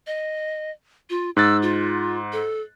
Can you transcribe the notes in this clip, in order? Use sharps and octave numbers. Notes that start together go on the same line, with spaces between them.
D#5
F4
G#2 E6 F#6 A6
F4
A4